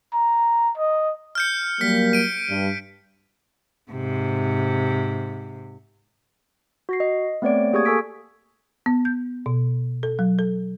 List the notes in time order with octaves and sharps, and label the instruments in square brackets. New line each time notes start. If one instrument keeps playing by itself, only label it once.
[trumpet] A#5
D#5
[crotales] F6 G6 C#7
[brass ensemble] F#3 G3 A#3 [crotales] F6 B6
[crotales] D7 D#7
[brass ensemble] G2
[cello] G#2 C3
[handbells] F#4 A#6 C7
D#5
A3 B3 C4 C#5 D5 D7
A#3 G4 G#4 C#6 D#6 G#6
A4 G#5 C#6 E6 B6 D7
[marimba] B3
G6
B2
A4
F#3
A4